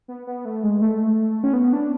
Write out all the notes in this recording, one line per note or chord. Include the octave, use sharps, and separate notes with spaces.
B3
B3
A3
G#3
A3
C#4
B3
D4